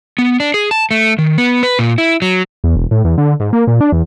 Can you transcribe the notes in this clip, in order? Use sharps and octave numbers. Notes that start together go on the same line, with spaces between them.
B3
D4
G#4
A5
A3
D#3
B3
B4
A#2
E4
F#3
E2
E1
A2
E2
D3
G#2
A#3
A#2
D4
E2